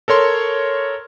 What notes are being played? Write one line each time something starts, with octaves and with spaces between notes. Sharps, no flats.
A4 A#4 C#5 C6